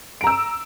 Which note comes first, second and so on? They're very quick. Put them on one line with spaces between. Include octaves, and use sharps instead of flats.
D7 A#5 E6